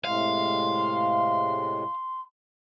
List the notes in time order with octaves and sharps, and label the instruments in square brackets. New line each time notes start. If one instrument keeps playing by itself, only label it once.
[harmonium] A2 C3 G#3 [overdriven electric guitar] F5 [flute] C6